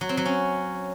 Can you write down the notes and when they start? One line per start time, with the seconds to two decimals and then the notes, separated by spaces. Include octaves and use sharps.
0.01 F#3
0.09 C4
0.17 F#3
0.26 C#4